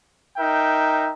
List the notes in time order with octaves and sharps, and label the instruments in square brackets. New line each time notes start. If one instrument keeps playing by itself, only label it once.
[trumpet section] D#4 A#4 E5 G5